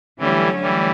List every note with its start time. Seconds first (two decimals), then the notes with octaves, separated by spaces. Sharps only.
0.20 D3 E3 F#3 G3 A3 C#4
0.62 E3 G3